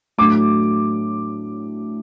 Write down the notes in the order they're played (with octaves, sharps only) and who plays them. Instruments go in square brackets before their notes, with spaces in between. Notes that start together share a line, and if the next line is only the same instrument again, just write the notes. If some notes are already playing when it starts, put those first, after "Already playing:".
[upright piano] A2 F#3 A3 D4 D6